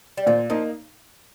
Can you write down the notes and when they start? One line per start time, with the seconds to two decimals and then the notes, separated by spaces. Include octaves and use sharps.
0.17 G3
0.26 A#2 F3
0.50 F3 A#3 D#4